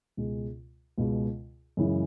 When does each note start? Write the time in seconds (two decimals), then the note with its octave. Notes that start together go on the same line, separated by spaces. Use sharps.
0.17 C#2 B2 G#3
0.98 C#2 B2 G#3
1.77 F#2 C#3 E3 G#3 C#4